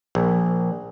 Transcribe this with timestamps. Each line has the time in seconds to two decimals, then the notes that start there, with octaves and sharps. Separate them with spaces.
0.15 A#1